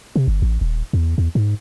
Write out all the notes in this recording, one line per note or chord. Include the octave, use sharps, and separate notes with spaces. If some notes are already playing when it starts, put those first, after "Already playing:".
C3
G1
A1
D#1
E2
E2
G#2